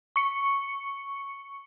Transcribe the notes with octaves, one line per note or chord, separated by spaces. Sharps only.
C#6 C#7